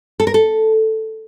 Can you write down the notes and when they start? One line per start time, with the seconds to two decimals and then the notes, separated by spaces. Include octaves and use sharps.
0.20 A4
0.27 A#4
0.34 A4